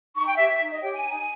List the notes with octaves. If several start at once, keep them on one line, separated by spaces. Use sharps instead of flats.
D#4 C#6
G5
G4 C#5 E5
E5
D#4
D#5
G4 C#5 G5
G#5
D#4